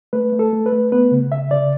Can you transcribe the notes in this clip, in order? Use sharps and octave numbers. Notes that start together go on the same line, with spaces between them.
A3 B4
A3
A4
A3
B4
A3
B3 B4
C#3
C#3 E5
C#3 D5